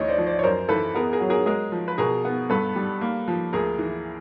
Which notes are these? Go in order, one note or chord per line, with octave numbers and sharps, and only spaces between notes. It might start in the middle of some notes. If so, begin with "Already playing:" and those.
Already playing: D2 E3 C#5 D#5
C5 D5
F3
C5 D5
C#5
F#2 A#4 C5
E3 A4 B4
B3 G#4 A#4
G#4 A#4
F#3
G#4 A#4
G#3 G#4 A#4
F3
B4
B2 G#4 A#4
B3
G2 A4 B4
G3
A#3
F3
D2 G#4 A#4
E3